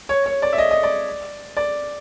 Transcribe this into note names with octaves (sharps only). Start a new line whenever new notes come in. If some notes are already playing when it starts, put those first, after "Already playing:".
C#5
C#5
D5
E5
D#5
D#5
D5
D5